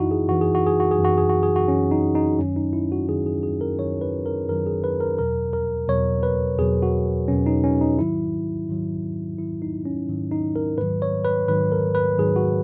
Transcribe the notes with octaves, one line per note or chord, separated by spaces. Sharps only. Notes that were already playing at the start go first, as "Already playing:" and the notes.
Already playing: F#2 E3 D#4 E4 F#4
G#4
F#2 E3 F#4
G#4
F#4
G#4
F#4
G#4
F#2 E3
F#4
G#4
F#4
G#4
F#4
F#2 E3 C#4
D#4
D#4
F#2 D#3 F#3 C#4
D#4
E4
F#4
F#2 D#3 F#3 G#4
G#4
G#4
A#4
F#2 D#3 F#3 C#5
B4
A#4
F#2 D#3 F#3 A#4
G#4
B4
A#4
E2 B2 F#3 A#4
A#4
E2 B2 F#3 C#5
B4
E2 B2 F#3 G#4
F#4
E2 B2 F#3 C#4
D#4
C#4
D#4
G#2 D#3 F#3 E4
G#2 D#3 F#3
G#2 D#3 F#3 E4
D#4
C#4
G#2 D#3 F#3
D#4
A#4
G#2 D#3 F#3 B4
C#5
B4
G#2 D#3 F#3 B4
A#4
B4
G#2 D#3 F#3 G#4
F#4